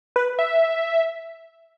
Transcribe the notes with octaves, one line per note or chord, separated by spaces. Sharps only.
B4
E5